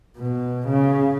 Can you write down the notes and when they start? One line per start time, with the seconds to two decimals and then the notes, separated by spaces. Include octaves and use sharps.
0.17 B2
0.69 C#3